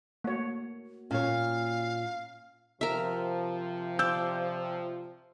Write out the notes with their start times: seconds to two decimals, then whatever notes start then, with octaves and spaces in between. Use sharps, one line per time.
0.24 A3 A#3 F#4 C#5
1.11 A#2 C#4 C#5 F5
2.81 C3 F3 A#4 E5
3.99 D5 E6 G6